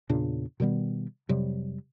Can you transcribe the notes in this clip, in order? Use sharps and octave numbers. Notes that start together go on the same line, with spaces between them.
E2 A#2 C#3 D4
B2 D#3 G3 B3
F2 C3 F#3 G3